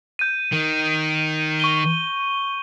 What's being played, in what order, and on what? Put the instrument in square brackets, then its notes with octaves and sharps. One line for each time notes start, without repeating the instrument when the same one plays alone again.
[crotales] G6 D#7
[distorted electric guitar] D#3
[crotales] C#6 D#7 G7